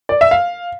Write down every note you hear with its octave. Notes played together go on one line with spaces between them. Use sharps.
D5
E5
F5